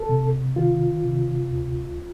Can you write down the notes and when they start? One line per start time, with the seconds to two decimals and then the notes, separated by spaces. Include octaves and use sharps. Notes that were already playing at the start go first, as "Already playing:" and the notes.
Already playing: A4
0.09 C3
0.56 D#3 F4
1.03 C3
1.51 D2